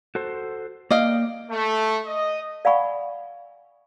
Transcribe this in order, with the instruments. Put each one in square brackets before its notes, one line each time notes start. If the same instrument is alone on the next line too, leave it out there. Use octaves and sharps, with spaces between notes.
[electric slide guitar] F#4 A4 C5
[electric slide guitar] A#3 G5 [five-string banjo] D5 D#5 F5
[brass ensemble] A3
D#5
[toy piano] D5 F5 F#5 G#5 B5 C#6